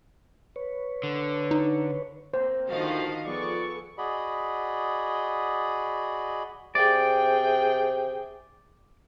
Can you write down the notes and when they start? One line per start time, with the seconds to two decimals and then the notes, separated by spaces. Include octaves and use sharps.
0.56 B4 C#5
1.03 D3
1.51 D#4
2.34 A#3 C4 C5
2.69 D2 D#3 F3 F#4 D#5 F5
3.25 F3 B3 F4 G#4 A4 D5 C#6
3.98 F#4 G#4 D5 D#5 B5
6.75 C3 G#4 D5 G5